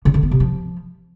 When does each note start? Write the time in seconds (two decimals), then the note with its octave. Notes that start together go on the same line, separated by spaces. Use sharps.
0.05 C#3
0.14 D3
0.23 B3
0.31 C3
0.40 F3